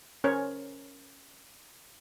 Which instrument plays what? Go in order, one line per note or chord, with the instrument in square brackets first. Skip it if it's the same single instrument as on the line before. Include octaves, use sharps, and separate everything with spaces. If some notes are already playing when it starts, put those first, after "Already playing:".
[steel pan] C#4 A#4 C5 C#5